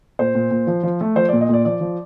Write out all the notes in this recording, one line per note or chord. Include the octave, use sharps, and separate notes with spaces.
A#2 C5
A#2
A#2
F3
F3
A3
F3 C5
D5
A#2
D#5
A#2 D5
F3 D5
F3